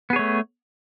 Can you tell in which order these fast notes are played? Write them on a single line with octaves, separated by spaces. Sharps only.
B3 G#4 C#5 A3